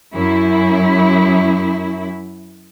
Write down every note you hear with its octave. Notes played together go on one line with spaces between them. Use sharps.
F#2 E4